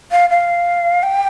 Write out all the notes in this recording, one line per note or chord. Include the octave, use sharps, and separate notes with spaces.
F5
F5
G5